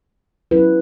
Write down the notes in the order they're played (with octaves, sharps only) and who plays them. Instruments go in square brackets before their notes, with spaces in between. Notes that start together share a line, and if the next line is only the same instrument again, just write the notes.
[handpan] F#3 C#4 E4 B4